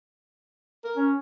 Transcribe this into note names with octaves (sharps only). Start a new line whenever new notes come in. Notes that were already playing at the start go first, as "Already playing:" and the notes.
A#4
C#4